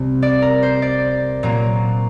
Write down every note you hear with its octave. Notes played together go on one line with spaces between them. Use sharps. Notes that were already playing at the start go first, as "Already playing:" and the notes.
Already playing: C2 C3 G3 C4
D5
A#4
C5
D5
A#2 F#3 A#3